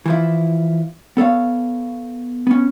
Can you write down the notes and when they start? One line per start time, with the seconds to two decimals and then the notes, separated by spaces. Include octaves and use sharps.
0.06 E3 F3 E4
1.17 B3 A4 C#5 F5
2.47 B3 C#4